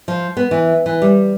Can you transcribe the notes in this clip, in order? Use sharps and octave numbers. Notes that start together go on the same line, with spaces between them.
F3
B3
E3
E3
G3